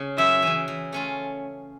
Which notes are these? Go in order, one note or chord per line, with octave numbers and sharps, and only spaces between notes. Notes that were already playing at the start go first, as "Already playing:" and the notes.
Already playing: C#3
F#2 E5
C#3 E3
E3
A3 C#4 F4